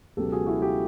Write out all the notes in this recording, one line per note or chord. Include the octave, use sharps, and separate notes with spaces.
C#2 B2 F#3 G4 A4
F#4 G#4
E4 F#4
F4 G4